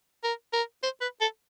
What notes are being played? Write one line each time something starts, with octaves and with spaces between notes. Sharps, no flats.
A#4
A#4
C5
B4
A4